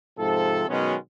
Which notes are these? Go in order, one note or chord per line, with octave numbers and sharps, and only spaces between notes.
G#2 C3 F3 A4
B2 D#3 F#3 G#3 B3 C#4